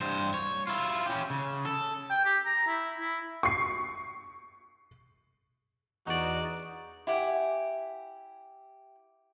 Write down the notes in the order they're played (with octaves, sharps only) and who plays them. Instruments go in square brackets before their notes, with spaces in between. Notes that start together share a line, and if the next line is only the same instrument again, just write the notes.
[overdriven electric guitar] G2 C5
C#5
E4 F4
C#4 G4
C#3
A4
[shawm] G5
G4
A#5
E4
E4
[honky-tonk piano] C#6 C7
[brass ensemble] E2 [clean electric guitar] D#4 D5 [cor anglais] F#4
[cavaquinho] E4 G4 F#5 G#5